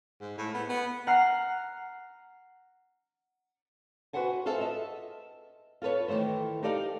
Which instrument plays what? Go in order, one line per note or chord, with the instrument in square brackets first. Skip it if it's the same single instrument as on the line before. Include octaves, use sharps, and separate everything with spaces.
[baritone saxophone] G#2
A2
B3
B3
[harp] F#5 A#5 F6 C7
[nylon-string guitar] F#4 G#4 B4 C5 F#5 G#5
F4 G#4 A4 C5 E5
D#5 E5
F4 A4 B4 C#5
D#3 E3 G#3 A3 C5
D#4 G4 A4 D5 D#5 F5